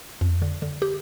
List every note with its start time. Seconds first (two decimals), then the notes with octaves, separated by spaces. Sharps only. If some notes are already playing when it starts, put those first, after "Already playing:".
0.21 F2
0.42 D3
0.62 D3
0.82 G4